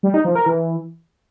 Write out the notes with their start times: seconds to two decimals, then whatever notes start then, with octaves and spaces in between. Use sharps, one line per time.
0.03 G3
0.14 D#4
0.25 F3
0.35 A#4
0.46 E3